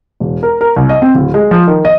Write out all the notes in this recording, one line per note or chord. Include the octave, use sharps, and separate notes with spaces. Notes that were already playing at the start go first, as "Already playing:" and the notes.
E1
A#4
A#4
C2
D#5
C4
D1
G#3
F3
D#3
D#5